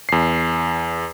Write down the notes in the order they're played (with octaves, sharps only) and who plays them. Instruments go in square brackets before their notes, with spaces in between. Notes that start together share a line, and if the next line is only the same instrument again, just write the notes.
[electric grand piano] E2 C7